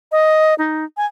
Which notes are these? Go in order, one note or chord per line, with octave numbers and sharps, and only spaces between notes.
D#5
D#4
G#5